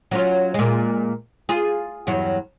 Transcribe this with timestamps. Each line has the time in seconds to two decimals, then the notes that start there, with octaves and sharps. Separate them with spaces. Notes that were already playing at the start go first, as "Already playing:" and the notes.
0.11 F#3 C#4 F4
0.54 A#2 G#3
1.49 F4 G#4
2.07 E2 G2 F#3